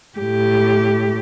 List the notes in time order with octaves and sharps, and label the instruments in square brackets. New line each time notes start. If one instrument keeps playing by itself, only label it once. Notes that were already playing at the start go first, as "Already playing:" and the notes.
[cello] A2 G4